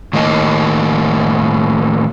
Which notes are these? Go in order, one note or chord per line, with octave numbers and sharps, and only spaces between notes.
A2 D#3 A#3 D#5